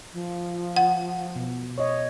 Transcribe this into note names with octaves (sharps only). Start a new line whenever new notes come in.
F3
F#5
B2
C#5 D#5